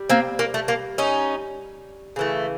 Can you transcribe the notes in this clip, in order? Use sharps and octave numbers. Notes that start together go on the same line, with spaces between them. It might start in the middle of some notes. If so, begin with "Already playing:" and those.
Already playing: G3
A#3 C4
A#3
A3
A#3
C#4 D#4
C#3 E3 A3